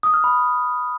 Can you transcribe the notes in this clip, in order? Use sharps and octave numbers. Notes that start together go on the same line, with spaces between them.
D#6
F6
B5